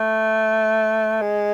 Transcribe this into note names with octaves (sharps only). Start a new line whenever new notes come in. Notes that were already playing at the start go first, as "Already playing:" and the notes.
Already playing: A3
G#3